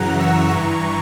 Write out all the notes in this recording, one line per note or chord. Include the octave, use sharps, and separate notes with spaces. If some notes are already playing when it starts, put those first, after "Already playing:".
Already playing: F#2 C#3 E3 F#5 A#5
C#6 E6
G2 E3 A#5 C#6